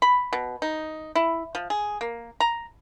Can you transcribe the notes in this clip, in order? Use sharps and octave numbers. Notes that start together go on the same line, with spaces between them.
B5
B2
D#4
E4
F3
G#4
A#3
A#5